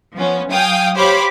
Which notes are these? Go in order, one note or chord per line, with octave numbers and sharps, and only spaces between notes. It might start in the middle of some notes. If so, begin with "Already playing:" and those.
F3 B3 C#4
F#3 F5 G5 G#5 D#6
G4 C5 C#5 F5 B5 D6